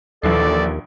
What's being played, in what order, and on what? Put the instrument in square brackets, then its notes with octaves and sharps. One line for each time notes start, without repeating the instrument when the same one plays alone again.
[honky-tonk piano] A#1 E3 C7 [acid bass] D#2 [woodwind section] A4 [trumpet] D5